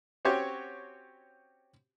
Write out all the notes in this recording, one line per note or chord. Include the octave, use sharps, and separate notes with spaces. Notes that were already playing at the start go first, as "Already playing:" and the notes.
C4 C#4 F#4 G4 C#5